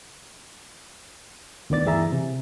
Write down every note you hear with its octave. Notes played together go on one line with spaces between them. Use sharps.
D2 D#3 B3 D5 A6
G2 E3 G#4 E5 A#5
C3